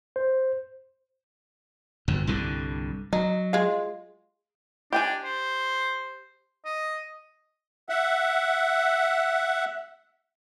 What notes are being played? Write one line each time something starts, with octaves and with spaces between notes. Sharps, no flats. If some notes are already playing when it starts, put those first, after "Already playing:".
C5
G1 F2
C2 G2 D3
F#3 D#4
G#3 F4
D4 G4 G5 G#5
C5
D#5
E5 F#5